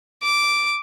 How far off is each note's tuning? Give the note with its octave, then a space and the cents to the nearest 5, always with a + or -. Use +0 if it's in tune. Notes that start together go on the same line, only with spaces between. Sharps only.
D6 -5